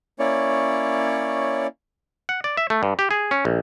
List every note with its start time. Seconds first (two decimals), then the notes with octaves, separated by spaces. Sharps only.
0.19 A#3 C#4 E4 C#5 D5
2.29 F#5
2.44 D5
2.57 E5
2.70 A3
2.83 G2
2.99 G4
3.11 G#4
3.31 C#4
3.45 A#1